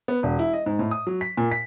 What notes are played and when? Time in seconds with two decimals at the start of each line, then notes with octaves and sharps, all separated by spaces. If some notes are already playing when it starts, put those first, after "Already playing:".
0.08 B3
0.23 E1
0.39 E4
0.53 D#5
0.66 G#2
0.79 A2
0.91 D#6
1.07 F#3
1.21 B6
1.37 A#2
1.51 B6